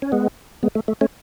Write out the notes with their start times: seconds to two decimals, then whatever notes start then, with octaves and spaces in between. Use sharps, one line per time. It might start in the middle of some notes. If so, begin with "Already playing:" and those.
0.02 C#4
0.12 G#3 B3
0.63 G#3 B3
0.75 A3
0.88 A3
1.01 A3 C#4